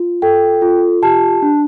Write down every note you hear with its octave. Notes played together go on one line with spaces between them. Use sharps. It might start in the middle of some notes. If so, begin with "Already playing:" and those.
Already playing: F4
A4 G5
F4
G4 A5
D4